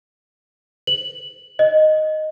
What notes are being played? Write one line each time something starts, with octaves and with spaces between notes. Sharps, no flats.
F#7
D#5